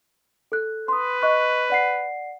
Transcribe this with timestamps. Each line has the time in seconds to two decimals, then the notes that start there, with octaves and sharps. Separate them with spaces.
0.52 A4 F#6
0.88 B4 C6 D#6
1.22 D#5 C#6 F#6
1.70 D5 F#5 C7